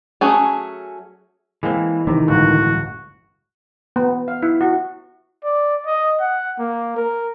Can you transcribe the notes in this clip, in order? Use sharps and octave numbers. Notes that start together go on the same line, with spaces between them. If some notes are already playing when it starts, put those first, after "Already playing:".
F#3 A3 C#4 G#4
E3 G#3 A#3 C4
C3 D#3
G1 C#2 A2 F#4
B3
F5
E4
F#4
D5
D#5
F#5
A#3
A#4